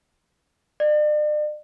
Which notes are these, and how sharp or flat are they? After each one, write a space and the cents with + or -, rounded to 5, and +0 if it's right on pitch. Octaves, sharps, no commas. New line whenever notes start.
D5 +40